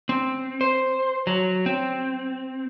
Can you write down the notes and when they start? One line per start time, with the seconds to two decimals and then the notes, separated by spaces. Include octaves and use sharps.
0.09 C4
0.61 C5
1.27 F#3
1.66 C4